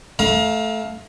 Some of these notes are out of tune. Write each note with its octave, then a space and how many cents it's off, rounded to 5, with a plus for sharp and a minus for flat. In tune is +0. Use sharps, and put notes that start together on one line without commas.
A3 -10 F5 +15 A#5 +35